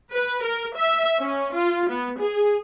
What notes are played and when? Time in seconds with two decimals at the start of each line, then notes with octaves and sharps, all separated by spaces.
0.12 B4
0.43 A#4
0.76 E5
1.19 C#4
1.53 F4
1.89 B3
2.20 G#4